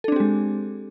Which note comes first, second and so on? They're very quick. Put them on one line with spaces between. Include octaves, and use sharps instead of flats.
A4 D4 C4 G4 G#3